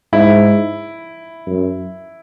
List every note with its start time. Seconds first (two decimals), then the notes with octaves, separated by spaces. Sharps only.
0.13 G#2 E4
1.46 F#2